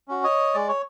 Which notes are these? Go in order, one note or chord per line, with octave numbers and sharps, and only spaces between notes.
C#4 F#4
C#5 D#5
G#3 D5
C#5